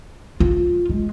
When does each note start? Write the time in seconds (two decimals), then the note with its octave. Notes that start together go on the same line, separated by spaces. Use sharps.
0.40 F4
0.90 G#3